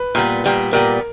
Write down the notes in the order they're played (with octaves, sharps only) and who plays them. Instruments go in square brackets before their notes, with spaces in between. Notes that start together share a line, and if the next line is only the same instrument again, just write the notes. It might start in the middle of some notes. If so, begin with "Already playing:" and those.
Already playing: [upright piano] B4
[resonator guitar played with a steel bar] A#2 G3 B3
A#2 G3 B3
[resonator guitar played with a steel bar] A#2 G3 B3 [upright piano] A#4